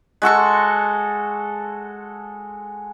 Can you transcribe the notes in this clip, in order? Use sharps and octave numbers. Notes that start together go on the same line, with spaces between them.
G#3 F#4 A4 C#6